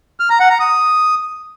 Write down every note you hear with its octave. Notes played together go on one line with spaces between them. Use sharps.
F6
A#5
F#5
A#5
D#6